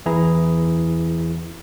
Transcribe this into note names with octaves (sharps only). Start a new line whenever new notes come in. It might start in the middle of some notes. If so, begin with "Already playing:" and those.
E2 E3 E4 G#4 A#5